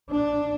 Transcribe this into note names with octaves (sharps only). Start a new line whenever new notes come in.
D4